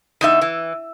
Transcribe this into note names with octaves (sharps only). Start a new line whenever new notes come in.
E2 D#4 E5
E3